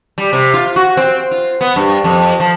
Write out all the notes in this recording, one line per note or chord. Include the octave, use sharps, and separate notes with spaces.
G3
C3
F4
F#4
C4
F4
B3
G2
F2
F3